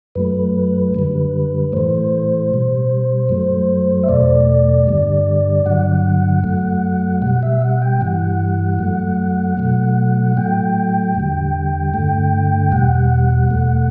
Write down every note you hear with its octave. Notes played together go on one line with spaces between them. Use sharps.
F#2 F#3 A3 B4
F#2 D3 G3
A2 E3 A3 C5
B2 G3
F#2 F#3 A3
E5
E2 B2 A3 D5
G2 D3 G3
G2 D3 F#3 F#5
F#2 F#3 A3
B2 G3 F#5
E5
F#5
G5
G2 E3 G3 F#5
F#2 F#3 A3
B2 F#3 A3
A2 F#3 A3 G5
E2 D3 G3
G2 D3 A3
E2 B2 G3 F#5
E2 B2 A3